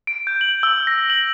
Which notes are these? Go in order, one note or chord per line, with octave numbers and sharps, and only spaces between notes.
D7
G6
F#7
E6
A#6
F#7